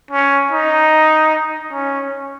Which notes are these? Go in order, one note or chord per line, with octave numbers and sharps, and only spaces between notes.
C#4
D#4
C#4